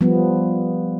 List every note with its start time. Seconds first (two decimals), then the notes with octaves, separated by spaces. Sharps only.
0.01 F3 G3 B3